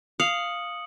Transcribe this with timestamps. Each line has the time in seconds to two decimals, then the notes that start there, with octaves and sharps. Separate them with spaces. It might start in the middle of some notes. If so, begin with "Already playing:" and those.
0.20 F5 D#6 C#7 F#7